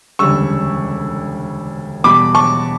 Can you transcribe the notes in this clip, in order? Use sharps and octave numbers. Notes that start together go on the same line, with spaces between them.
E1 D2 C#3 G3 C#6 E6
E2 B2 G3 B5 D6
A5 C#6